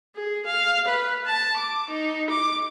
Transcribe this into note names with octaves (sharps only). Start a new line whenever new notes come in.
G#4
F5
B4
A5
D6
D#4
D6